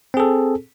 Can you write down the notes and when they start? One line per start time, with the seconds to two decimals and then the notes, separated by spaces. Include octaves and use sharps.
0.14 C4
0.17 G#4
0.20 A4